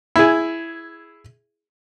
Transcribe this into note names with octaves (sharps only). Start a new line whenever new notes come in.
E4 G#4